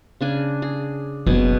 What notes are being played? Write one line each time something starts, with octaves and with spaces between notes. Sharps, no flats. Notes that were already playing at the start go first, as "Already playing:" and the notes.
C#3 D4 G#5
G#4
F#1 B2 G#4 G#5